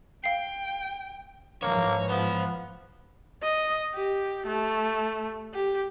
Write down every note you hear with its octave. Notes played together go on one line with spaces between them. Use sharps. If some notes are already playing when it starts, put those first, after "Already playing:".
F5 G5 C7
G#2 E3 F3 A#3 C#5
B3 C5 F5
D#5
G4
A3
G4